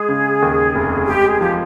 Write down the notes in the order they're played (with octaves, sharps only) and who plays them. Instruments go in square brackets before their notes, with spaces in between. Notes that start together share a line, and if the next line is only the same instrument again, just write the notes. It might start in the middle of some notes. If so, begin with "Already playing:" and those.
Already playing: [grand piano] G#3 [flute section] G#4
[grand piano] C#3
D#2
F1
[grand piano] G#3 [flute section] G4
[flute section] G#4
[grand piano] F3 [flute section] G4